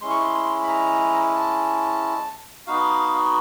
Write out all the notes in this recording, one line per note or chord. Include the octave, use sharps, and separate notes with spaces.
G#3 C#4 E4 C6
C#6
C6
B5
A#5
A5
B3 D#4 F#4 F5